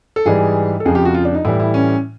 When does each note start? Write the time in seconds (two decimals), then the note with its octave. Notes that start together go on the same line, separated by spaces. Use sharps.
0.16 A4
0.25 G#2 E3 G3 G#4
0.80 A4
0.85 F2 C#3 F3 G#4
0.95 G4
1.05 F#4
1.15 F4
1.25 D4
1.35 D#4
1.45 A2 E3 G3 E4
1.60 E4
1.74 C#4